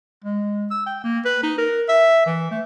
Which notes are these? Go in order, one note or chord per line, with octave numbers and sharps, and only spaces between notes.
G#3
E6
G5
A#3
B4
D#4
A#4
E5
E3
A3